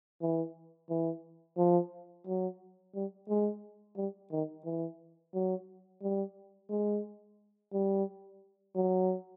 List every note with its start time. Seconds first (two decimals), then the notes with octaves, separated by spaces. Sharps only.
0.21 E3
0.90 E3
1.57 F3
2.27 F#3
2.95 G3
3.29 G#3
3.97 G3
4.31 D#3
4.65 E3
5.34 F#3
6.02 G3
6.70 G#3
7.73 G3
8.75 F#3